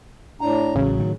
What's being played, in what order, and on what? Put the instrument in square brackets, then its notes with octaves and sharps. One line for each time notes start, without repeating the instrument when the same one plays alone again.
[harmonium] A2 D4 A#5
[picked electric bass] A1 [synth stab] C#3 [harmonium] F#3
[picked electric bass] A2 D#3